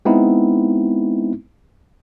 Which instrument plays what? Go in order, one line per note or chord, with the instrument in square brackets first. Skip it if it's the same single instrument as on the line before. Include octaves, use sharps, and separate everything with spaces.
[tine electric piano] G#3 B3 C4 D#4 E4